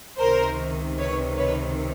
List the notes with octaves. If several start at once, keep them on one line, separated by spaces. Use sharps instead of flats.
C#2 C3 D#3 A#4 C5
B4 C#5
B4 C#5